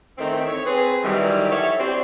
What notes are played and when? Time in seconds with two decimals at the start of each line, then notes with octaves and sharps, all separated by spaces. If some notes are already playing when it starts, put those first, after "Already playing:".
0.18 D#3 E3 A3 C4
0.46 C#5
0.65 C4 G#4 B4
1.04 D#3 E3 F#3 G3
1.51 E4 A4 C#5
1.78 C4 D4 F#4 G4 C5